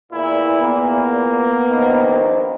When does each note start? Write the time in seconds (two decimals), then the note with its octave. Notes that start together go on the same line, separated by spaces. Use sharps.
0.12 E2 A#2 E4
0.62 A#3 B3
1.70 A#1 D#3 C4